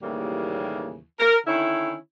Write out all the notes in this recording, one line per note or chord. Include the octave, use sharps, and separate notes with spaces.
D#2 A2 C#3 E3 G3 A#3
A#4
D3 D#3 C#4 E4